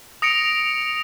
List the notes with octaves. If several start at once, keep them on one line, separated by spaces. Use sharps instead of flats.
D#6 A#6 C#7 D7 F7